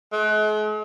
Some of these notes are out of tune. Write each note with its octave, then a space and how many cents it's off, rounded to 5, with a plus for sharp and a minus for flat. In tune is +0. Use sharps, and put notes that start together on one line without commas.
G#3 +45